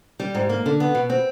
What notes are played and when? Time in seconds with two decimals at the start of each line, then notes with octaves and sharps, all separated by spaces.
0.20 G3
0.35 G#2
0.49 A#3
0.66 D3
0.80 B3
0.95 B2
1.10 C4